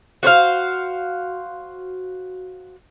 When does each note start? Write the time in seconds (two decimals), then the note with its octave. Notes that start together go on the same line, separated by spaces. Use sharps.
0.23 F#4 C5 C#5 F5